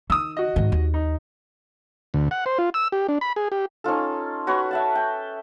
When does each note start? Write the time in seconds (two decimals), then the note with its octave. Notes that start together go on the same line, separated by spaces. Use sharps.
0.10 D#3 D#6 E6
0.37 F#4 D#5
0.56 G#2 D#3
0.72 D#2
0.94 D#4
2.14 D2
2.31 F#5
2.46 C5
2.59 F4
2.74 E6
2.92 G4
3.08 D4
3.21 B5
3.36 G#4
3.52 G4
3.84 C#4 D#4 F4 A4
4.47 F#4 B4 C#5 C#6
4.71 E5 F#5 A5
4.95 G5